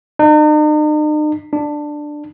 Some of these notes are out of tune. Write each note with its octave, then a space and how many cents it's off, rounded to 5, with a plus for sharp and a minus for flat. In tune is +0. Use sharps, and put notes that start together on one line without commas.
D#4 -45
D4 +10